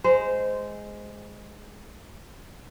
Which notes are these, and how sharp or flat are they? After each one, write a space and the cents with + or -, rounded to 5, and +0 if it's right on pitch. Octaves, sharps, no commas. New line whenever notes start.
G#3 +0 C5 -15